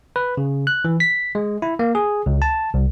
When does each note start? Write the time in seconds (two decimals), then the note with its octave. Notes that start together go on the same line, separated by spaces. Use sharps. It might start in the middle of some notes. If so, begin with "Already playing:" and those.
0.16 B4
0.37 C#3
0.67 F#6
0.85 E3
1.00 B6
1.35 G#3
1.62 E4
1.79 A#3
1.95 G#4
2.26 C#2
2.42 A5
2.74 C2